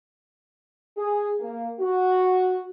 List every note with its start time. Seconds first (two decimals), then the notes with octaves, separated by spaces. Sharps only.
0.97 G#4
1.40 A#3
1.80 F#4